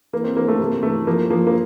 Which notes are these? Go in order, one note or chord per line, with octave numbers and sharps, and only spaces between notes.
E3 A#3
C4
E3 A#3
A3
C3 A#3
E3 A3
F3 A#3
F3 A#3
A#3